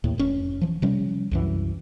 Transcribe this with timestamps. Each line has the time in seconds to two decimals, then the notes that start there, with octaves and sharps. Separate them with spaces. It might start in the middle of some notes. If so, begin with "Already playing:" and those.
0.04 D#2 A2
0.18 F1 C#4
0.61 E3 F3
0.82 C3 F3 G3 C#4
1.31 C2 F#2 E3